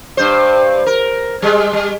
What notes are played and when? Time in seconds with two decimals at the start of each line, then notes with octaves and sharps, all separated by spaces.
0.17 G2 C5
0.86 A#4
1.42 G3 G#3
1.73 G3